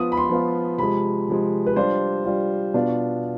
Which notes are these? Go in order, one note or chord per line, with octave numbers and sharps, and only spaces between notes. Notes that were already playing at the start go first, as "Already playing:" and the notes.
Already playing: F3 B3 F4 D#6
B5
C6
F3 B3 F4
C3 F3 G#3 B5
C3 F3 G#3
B4
G3 D4 F4 C5
G3 D4 F4
B2 B3 D4 F4